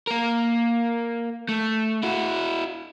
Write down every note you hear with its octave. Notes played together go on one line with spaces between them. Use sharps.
A#3 A#4
A3
E4 F#4